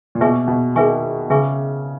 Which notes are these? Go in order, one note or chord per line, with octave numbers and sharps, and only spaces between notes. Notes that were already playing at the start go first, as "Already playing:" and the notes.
A#2
B2 G#4 B4 E5 G#5 C#6
B2
D#3 G#4 B4 E5 G#5 C#6
C#3 G#4 B4 E5 G#5 C#6